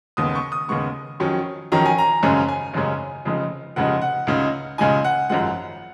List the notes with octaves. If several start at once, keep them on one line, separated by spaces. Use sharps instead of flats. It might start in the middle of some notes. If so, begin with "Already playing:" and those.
D#2 C#3 G#3 B3 D#6
C#6
D#6
D#2 C#3 G#3 B3 C#6
F2 D#3 F#3 C#4
F2 D#3 F#3 C#4 A#5
G#5
A#5
G#1 F#2 C#3 G#3 C#4 G#5
G#5
G#1 F#2 C#3 G#3 C#4
F1 F2 C#3 G#3 D#4
F1 F2 C#3 G#3 D#4 F#5
F#5
C#2 C#3 G#3 D#4
C#2 C#3 G#3 D#4 G#5
F#5
G#1 F#2 F3 G#3 F#5